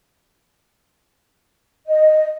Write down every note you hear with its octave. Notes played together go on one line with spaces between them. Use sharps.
D#5